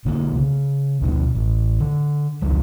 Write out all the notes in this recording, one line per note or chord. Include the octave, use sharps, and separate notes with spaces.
B1 D3 E3 A#3
C#3
D2 B2 F3
A1
D3
C#2 F3 G3